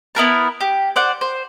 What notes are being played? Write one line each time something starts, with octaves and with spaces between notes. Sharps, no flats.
B3 E4 A#4 A5
G4
C5 D5 F#5
C5